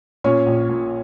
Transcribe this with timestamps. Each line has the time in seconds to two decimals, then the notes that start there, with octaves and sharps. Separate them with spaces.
0.24 A#2 C#4 C#5
0.46 A#1
0.69 A#2